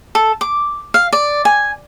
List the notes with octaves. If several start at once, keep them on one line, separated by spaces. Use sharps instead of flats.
A4
D6
F5
D5
G#5